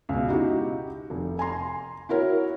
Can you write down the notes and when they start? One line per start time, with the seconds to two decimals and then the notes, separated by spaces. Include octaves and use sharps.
0.09 C#2 B2
0.29 D#4 E4 F#4 G4
1.10 F1
1.39 G#5 A#5 C6
2.09 E4 F#4 A#4 C#5